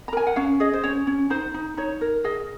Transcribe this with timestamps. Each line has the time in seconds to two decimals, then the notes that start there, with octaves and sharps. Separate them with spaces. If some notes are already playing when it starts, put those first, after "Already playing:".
0.08 A#5
0.13 A#4 G#5
0.27 F#5
0.36 C#4 F5
0.60 G#4 D#5
0.73 C5
0.83 C#4 C#5
1.07 C#4
1.30 D#4 C5
1.54 D#4
1.77 D#4 C#5
2.01 A#4
2.24 G#4 D#5